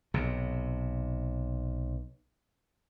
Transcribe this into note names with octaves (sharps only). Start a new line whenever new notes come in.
B1 C3